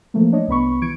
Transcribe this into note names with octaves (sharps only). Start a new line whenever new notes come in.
E3 F3 A3 A#3
D4 C#5 D#5
C2 B3 B5 C#6
E3 C#6 G#6 C#7 D7